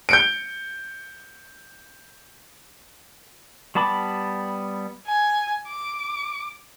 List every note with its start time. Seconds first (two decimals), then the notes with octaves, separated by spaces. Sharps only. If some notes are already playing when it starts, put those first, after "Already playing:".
0.09 G6 C#7 D7
3.75 G3 B3 A5 B5 D6
5.07 G#5
5.68 D6